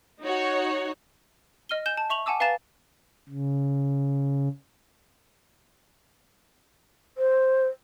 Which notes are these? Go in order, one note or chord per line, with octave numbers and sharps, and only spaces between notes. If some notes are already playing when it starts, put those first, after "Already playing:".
D#4 F#4 C#5
D#5 F6 D#7 G7
G#5 G6 E7 G7
A5
E5 C#6 F7 F#7
F#5 G#5 A5 D6 E6
B4 F5 G#5 A#5 A6 E7
C#3
C5